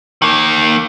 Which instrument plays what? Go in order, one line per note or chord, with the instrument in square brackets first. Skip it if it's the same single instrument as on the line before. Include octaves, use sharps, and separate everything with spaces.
[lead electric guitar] D#3 A#3